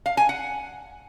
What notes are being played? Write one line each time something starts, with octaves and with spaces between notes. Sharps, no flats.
F5
G#5
F#5